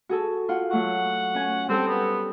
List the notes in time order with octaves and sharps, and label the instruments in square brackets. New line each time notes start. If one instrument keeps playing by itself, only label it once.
[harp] F#4 G#4 A4
F4 F#5
[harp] F#3 A3 C#6 [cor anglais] F#5
[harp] C#4 G#5
[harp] G3 A4 [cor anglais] C4
[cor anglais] B3